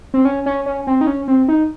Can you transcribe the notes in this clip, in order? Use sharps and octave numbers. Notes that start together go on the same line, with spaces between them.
C4
C#4
C#4
C#4
C4
D#4
C#4
C4
D#4